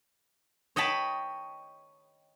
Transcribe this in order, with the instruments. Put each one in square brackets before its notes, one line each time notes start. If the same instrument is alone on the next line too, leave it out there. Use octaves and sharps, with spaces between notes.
[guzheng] C#5 D#5 G5 A5 B5